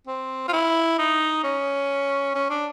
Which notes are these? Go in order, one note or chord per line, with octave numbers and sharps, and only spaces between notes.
C4
F4
E4
D#4
C#4
C#4
D4